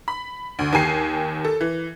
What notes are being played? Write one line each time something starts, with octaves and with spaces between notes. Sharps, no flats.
B5
D2
D#2 G4 G#5 C7
A4
E3